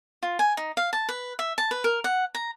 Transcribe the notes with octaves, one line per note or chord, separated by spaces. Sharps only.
F4
G#5
D#4
F5
A5
B4
E5
A5
B4
A#4
F#5
A#5